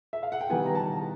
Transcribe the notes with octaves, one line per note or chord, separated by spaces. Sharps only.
E5
F5
F#5
G5
D#3 G3 B3 E4 G#5
A#5
A5